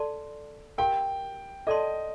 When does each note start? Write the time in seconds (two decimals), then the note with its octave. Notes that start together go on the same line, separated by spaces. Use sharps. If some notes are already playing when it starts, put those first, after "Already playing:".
Already playing: A4 D5 A5 C6
0.78 G4 A#4 F5 G5
1.67 A4 D5 D#5 A5 C6